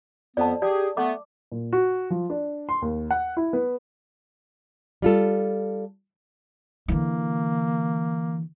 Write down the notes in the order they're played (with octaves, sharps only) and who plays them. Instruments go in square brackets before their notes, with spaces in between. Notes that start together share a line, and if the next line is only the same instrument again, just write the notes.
[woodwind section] F2 B3 [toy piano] D5 A5
[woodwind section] G4 G#4 [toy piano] D5
[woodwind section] A3 B3 [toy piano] D6
[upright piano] A#2
F#4
F3
D4
C6
D#2
F#5
E4
B3
[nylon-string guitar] G3 F4 A4
[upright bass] D3 E3 [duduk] A#3